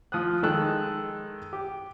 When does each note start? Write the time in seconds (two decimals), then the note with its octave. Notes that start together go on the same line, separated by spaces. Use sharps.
0.12 F3 D#6 F#6
0.43 D#3 G#3 A4 E6 F#6
1.53 G4